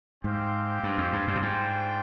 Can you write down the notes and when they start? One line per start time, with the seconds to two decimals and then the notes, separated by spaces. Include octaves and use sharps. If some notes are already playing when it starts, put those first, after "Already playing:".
0.24 G#2 G#3 C4 G4 C5 F5
0.83 G2
0.98 F2
1.13 G2
1.28 G2
1.35 B2
1.42 G#2 G3 D4 F4 C5 G5